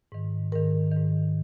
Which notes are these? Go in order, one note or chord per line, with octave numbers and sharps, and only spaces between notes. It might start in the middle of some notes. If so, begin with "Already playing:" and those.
G#2 D#3
G#2 D#3 A#4
G#2 D#3